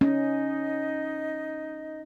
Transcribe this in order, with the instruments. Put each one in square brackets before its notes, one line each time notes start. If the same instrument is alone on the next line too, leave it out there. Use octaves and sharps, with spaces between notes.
[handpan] C#4 [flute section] D#4 D#5